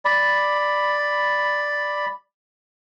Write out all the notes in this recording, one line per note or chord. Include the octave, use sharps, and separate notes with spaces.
D5 B5